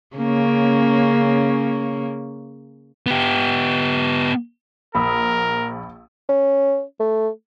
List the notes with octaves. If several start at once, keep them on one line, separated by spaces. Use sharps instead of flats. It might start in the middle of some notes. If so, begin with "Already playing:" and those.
C#3 A#3 C#4
B3 G4
A#1 A#4 B5 D#6 E6
C#4
A3